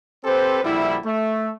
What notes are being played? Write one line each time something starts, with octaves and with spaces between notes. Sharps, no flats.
C4 G4 A4 B4 C5
A#1 D3 G3 E4
A3